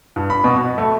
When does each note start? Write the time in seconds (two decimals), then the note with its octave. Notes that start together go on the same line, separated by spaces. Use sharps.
0.16 G2
0.30 B5
0.44 B2
0.56 F#4
0.78 A3